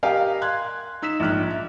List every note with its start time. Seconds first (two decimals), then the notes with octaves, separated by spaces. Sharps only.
0.03 G4 A#4 D#5 F5 G5 G#5
0.42 C6 F#6 G#6
1.02 D#4 E6 B6 E7
1.20 A#1 G#2 F6 F#6
1.50 E5